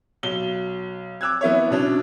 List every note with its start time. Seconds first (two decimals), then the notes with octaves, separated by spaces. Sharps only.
0.23 B1 G7
1.21 D6 E6 F#6 G#6
1.41 E3 B3 E4 C#5
1.71 B2 C#4 D4